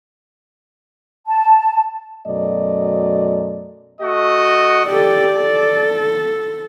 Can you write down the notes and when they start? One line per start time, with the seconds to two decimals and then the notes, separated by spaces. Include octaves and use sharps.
1.27 A5
2.27 F#2 B2 A3 D5 D#5
4.01 A3 F#4 D#5
4.86 G4 A4 D5
5.34 A4